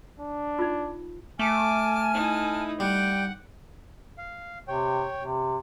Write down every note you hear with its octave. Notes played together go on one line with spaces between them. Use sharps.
D4
D#4 F4
A3 G#5 A5 D6 F6
D#4 E4
G3 F#5 G5 G6
F5
C3 C#5 G5
C3